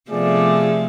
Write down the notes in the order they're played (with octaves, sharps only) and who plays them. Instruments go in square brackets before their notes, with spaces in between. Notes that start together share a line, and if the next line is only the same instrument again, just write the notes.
[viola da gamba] C3 F3 A3 [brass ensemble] B3 D5 [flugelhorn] G#4